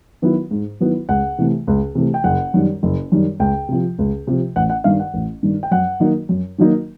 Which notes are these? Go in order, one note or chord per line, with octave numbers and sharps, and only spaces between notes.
D#3 F#3 B3 E4
G#2
D#3 F#3 B3 E4
C#2 F#5
C3 E3 A3
C#2
C3 E3 A3
G5
F#1 F#5
F#2 D#3 G3
F#1
F#2 D#3 G3
C#2 G5
C3 F3
C#2
C3 F3
A1 F#5
F#5
G2 D#3 F5
F#5
A1
G2 D#3
G5
F#2 F#5
D#3 F#3 A#3 D#4
F#2
D#3 F#3 A#3 D#4